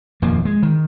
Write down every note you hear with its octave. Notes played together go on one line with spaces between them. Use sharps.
D#1 F2 F3 A#3
G#3
D#3